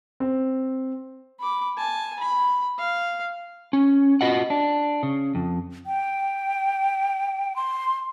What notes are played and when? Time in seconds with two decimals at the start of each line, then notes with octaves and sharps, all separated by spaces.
0.20 C4
1.40 B5 D6
1.77 G#5 A5
2.20 B5
2.79 F5
3.73 C#4
4.21 F4 F#4 D#5 F#5
4.50 D4
5.03 C#3
5.35 F2
5.86 G5
7.56 C6